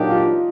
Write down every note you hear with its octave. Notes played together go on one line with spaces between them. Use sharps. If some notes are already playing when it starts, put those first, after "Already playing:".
Already playing: A#2 F#3 A#3 D4 D#4 G4
F4